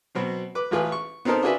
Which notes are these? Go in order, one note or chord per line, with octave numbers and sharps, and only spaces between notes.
B2 F#3 C4
B4 D6
A1 F4 G#4 B4
C#6
B3 C4 D#4 A4 A#4 C5
D4 F4 F#4 G#4 B4 E5